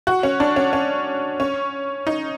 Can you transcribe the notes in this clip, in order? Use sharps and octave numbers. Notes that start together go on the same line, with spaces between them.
F#4
C#4
D4
C#4
C#4
C#4
D#4